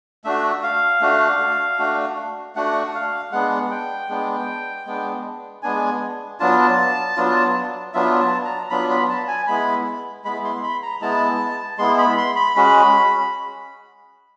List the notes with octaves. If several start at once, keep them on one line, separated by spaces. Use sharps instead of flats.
A3 D4 F#4 E5
F5
A3 D4 F#4
A3 D4 F#4
A3 D4 F#4 F#5
F5
G#3 B3 D4 F#5
G5
G#3 B3 D4
G#3 B3 D4
G#3 B3 D4 G#5
F#3 B3 D4 F4 A5
F#3 B3 D4 F4
F#3 B3 D4 F4 E5
A5
A#5
F#3 B3 D4 F4 B5
B5
A5
G#5
G#3 B3 E4 B5
G#3 B3 E4 B5
C6
B5
A#5
G#3 B3 E4 A5
G#3 B3 E4 C6
B5
C6
B5
G#3 C#4 F#4 B5